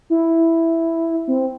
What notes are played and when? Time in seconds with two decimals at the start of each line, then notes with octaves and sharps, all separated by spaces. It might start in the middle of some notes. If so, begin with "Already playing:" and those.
0.10 E4
1.28 C4